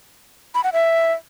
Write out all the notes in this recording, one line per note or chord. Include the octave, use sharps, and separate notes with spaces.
B5
F#5
E5